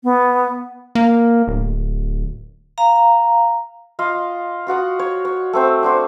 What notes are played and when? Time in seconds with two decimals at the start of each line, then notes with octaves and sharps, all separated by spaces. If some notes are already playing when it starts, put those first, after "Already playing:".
0.04 B3
0.95 A#3
1.48 D1
2.78 F5 A#5
3.99 F4 D#5 F5
4.67 F4 F#4 F#5 D#6
4.99 C#5
5.25 C#5
5.53 A3 C4 C5
5.83 D4 F#4 C5